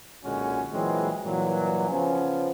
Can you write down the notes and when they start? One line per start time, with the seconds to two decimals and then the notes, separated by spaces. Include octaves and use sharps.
0.24 B1 A#2 D3 G#3 C#4 F#4
0.73 A#2 E3 F#3 G#3 C4
1.25 G2 A#2 E3 F#3
1.89 C#3 F3 B3 C#4